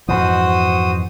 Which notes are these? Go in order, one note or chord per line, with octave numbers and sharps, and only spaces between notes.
F2 G#2 E3 F#4 C5 D#6